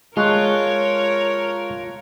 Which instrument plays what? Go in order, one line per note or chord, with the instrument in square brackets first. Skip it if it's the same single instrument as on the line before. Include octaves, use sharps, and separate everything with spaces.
[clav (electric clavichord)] G#3 [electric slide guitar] F4 [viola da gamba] A#4 C#5 [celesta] A5 C#6 F#6